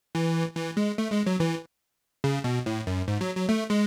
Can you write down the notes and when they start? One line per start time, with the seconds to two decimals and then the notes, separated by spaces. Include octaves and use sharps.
0.15 E3
0.55 E3
0.77 G#3
0.98 A3
1.12 G#3
1.26 F#3
1.40 E3
2.24 C#3
2.44 B2
2.66 A2
2.87 F#2
3.08 G#2
3.21 F#3
3.36 F#3
3.49 A3
3.70 G#3